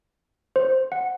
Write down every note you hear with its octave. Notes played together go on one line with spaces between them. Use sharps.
C5
F#5